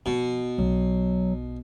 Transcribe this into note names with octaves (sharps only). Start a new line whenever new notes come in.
B2 F3
B1 F#3